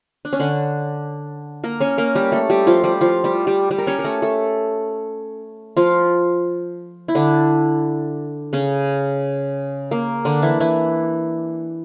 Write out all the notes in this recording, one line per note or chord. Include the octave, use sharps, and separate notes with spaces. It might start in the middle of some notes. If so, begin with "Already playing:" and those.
D4
C#4
D3 D4
A#3 A#4
C#4 C#5
A#3 A#4
G3 G4
A3 A4
G3 G4
F3 F4
G3 G4
F3 F4
G3 G4
G3 G4
G3 G4
A#4
C#4 C#5
A#4
A3 A4
A3 A4
F3 F4
E4
D3 D4
C#3 C#4
A#3
D3 D4
E3 E4
E3 E4